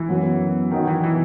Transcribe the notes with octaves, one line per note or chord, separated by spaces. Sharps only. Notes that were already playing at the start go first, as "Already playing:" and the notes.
Already playing: E3
F#2 F#3 B3
D#3 F#3 B3 D#4 F#4
E3
E3